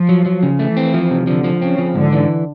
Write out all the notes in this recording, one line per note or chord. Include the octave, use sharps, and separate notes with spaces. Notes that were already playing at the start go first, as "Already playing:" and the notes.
Already playing: F3
F#3
F#3
C#3
E3 A3
C4
F3
C3
D3 F3
F3
C#3 C4
F3
G#2 D3
E3